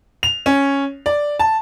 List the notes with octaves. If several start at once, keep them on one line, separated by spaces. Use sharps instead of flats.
F7
C#4
D5
A5